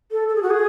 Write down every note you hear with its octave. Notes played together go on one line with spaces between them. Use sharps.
A4
A4
G#4
F#4
G#4